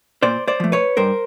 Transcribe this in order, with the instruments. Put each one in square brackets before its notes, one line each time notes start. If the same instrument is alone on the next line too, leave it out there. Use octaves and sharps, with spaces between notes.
[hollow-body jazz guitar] A#2 C5 D5
C5 D5
F3 A3
B4 C#5
G2 A#4 C5